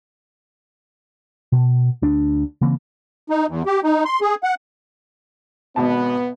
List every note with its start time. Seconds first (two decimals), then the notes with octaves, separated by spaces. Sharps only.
1.52 B2
2.02 D2 D4
2.61 C#3 E3 A#3 C4
3.30 D#4
3.48 E2
3.66 G4
3.84 D#4
4.05 C6
4.21 G#4
4.43 F#5
5.76 G#1 B2 B3 A5